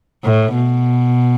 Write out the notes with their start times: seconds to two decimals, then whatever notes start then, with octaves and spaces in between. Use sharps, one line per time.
0.24 A2
0.55 B2